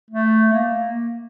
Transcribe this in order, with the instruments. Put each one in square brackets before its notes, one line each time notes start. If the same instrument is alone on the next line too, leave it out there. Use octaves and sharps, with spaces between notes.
[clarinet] A3
A#3